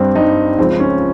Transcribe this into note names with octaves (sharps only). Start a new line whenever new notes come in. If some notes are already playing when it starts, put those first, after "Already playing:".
Already playing: G2 G3 C4
G2 G3 D#4
C#2 C#3 F3 C4
C#4